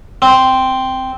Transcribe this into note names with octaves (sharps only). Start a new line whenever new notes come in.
C4